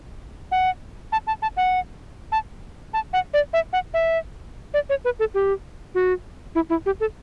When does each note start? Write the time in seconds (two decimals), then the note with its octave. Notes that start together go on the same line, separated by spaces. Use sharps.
0.52 F#5
1.12 A5
1.27 A5
1.42 A5
1.57 F#5
2.32 A5
2.94 A5
3.13 F#5
3.34 D5
3.53 E5
3.73 F#5
3.94 E5
4.74 D5
4.89 C#5
5.05 B4
5.19 A4
5.34 G4
5.95 F#4
6.55 E4
6.70 E4
6.86 G4
7.00 A4